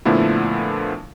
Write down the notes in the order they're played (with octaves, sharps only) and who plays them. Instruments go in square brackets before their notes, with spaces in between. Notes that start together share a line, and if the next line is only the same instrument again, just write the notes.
[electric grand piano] A#2 D3 F3 A3 B3 E4